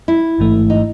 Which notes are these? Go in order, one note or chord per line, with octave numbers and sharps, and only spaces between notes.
E4
A1 G#2 E3 A3
D#4